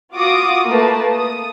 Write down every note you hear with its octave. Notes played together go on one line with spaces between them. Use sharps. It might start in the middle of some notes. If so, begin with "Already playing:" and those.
F4 F#4 D6 D#6
A3 A#3 B4 A5
D#6